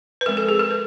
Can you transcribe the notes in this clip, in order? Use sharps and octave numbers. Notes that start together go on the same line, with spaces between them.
B4
F3 G#3 C4 A#4
A4
G#4
A#4
B4